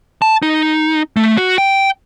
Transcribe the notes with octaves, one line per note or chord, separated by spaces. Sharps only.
A5
D#4
A3
F#4
G5